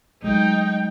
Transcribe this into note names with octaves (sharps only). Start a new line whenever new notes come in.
F#3 G#3 A3 D#4 G5